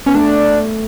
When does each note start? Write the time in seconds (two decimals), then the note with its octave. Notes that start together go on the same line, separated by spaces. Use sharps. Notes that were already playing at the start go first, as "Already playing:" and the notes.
0.06 B3 C#4
0.14 A3 D4